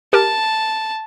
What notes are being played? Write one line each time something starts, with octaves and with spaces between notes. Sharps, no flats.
G4 A#4 A5